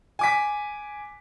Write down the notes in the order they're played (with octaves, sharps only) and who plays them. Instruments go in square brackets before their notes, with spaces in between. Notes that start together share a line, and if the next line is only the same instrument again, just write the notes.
[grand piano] G#5 D6 B6